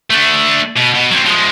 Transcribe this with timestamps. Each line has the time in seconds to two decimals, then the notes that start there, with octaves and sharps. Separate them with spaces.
0.10 A3 D4
0.77 B2
0.94 B2
1.11 F#3 C4
1.25 F3 G#3